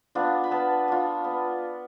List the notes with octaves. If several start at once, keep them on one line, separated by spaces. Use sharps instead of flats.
B3 D4 F4
B5
B3 A5
D4 F4
B3